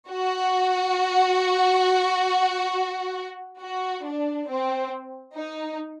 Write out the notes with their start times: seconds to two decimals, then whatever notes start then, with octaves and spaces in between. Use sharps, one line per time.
0.10 F#4
3.61 F#4
4.05 D4
4.49 C4
5.37 D#4